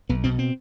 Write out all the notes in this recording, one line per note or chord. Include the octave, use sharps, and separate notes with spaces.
B1 B3
B2 C4
C4